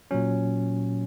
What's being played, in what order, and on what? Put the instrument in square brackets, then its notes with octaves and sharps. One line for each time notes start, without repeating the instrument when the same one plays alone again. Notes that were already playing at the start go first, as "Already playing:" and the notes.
[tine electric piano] A#2 F#3 C#4